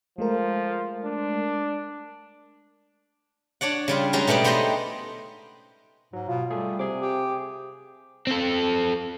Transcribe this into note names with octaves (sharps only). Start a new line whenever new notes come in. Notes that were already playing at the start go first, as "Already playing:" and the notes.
F3 G#3 A3 A#4
D4
D4 C#5 D5 F#5
C#3 G3 F4
G3 G#3 C#4 D#4 F#4
B2 A3 B3 G4 D5
B3 D#4 G4 C5 D#5
G#2 F#3
B2 F4
G3 A3 G#4 A4
C3 G#4 D6
G4
C4 A4